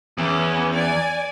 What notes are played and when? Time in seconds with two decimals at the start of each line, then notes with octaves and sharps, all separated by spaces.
0.18 E2 B3 C#4
0.74 D5 G#5